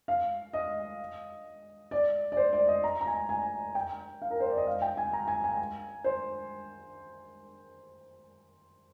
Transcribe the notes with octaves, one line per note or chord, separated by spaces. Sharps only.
F5
D#5
D5
D5
C5
D5
D#5
A#5
A#5
G#5
G#5
G5
F5
A#4
C5
D5
D#5
F5
G5
G#5
A#5
G#5
G#5
C5